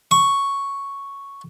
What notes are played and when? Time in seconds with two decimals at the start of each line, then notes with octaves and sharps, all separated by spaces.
0.11 C#6